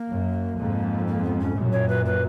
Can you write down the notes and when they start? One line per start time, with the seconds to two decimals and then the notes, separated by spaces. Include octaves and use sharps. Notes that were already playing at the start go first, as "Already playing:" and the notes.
Already playing: A#3
0.10 F#2
0.58 F2 G#2
1.07 A#3
1.24 B3
1.40 C#4
1.56 F#2 A#2
1.72 C#5
1.88 B4
2.05 B4